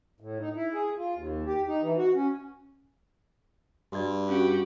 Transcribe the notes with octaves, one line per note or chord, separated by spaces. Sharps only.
A2
D#4
E4
G#4
F4
D#2
G4
D#4
E3
F#4
C#4
G2 F#4 G4 D5
C#4 F#4 G4